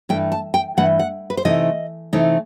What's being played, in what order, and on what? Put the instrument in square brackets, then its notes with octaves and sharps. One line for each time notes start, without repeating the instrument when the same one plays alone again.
[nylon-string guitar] G2 E3 A3 G5
A5
G5
G2 E3 A3 F#5
F#5
B4
C5
C3 E3 A3 D#4 D#5
C3 E3 A3 D#4